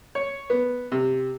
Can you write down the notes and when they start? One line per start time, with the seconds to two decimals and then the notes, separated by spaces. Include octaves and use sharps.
0.15 C#5
0.50 B3
0.92 C3